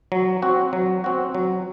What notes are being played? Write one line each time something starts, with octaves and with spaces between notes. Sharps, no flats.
F#3
C4 F#4
F#3
C4 F#4
F#3